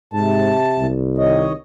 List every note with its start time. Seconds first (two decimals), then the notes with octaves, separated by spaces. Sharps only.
0.13 G#2 C3 A5
0.79 C2
1.18 D#3 C#5 D#5